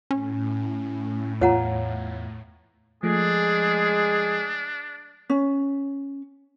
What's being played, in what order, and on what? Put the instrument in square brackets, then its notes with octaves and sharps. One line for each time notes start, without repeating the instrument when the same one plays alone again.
[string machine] A2 [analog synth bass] C#4
[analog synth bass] E2 [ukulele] F4 [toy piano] C#5 F#5 A#5
[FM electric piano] F3 A3 [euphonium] G#3 [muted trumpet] D4 [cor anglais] G#4
[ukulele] C#4